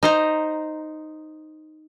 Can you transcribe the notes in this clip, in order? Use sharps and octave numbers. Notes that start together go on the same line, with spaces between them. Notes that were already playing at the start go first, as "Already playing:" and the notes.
D#4 C5 A#5